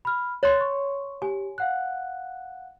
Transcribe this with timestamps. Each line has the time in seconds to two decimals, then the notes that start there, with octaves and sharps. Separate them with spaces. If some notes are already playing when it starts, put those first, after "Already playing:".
0.05 B5 F6
0.43 C#5 C6 F#6 A6
0.61 C#6
1.22 G4 G#5
1.58 F5 F#5 F#6